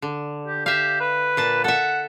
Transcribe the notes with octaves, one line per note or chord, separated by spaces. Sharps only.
D3
G4
G4 E5 F5
B4
A#2 A5
A4 E5 F#5